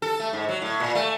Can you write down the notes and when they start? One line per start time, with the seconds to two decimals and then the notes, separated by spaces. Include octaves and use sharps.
0.02 A4
0.20 A3
0.33 G#2
0.49 F#3
0.62 A2
0.80 A#2
0.95 A3